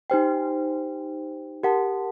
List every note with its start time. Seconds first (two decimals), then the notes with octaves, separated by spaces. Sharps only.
0.10 D#4 G4 C5 G5
1.64 G4 A#4 F#5 A5